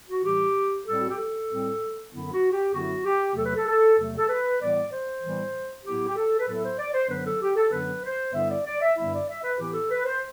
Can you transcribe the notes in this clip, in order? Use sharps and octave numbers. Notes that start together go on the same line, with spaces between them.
F#4
A2 E3 G3 G4
A2 G3 C4 A4
F#4
G4
A4
A2 G3 C4
F#2 D3 F#3 B3 E4
F#4
G4
F#2 D3 F#3 B3 E4 F#4
G4
E2 C3 F#3 A3 A4
B4
A4
A4
E2 C3 F#3 A3
A4
B4
A2 E3 G3 B3 D5
C5
A2 E3 G3 B3
A2 F#3 B3 E4 G4
G4
A4
B4
A2 F#3 B3 E4 A4
C5
D5
C5
F#2 D3 F#3 B3 D4 B4
A4
G4
A4
F#2 D3 F#3 B3 D4 B4
C5
G2 D3 G3 B3 E4 E5
D5
D5
E5
G2 D3 G3 B3 E4 E5
D5
E5
B4
A2 E3 B3 E4 G4
A4
B4
C5